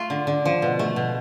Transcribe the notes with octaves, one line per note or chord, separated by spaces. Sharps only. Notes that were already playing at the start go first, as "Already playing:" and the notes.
Already playing: A3 F4
D3
D3
F3
B2
A3
B2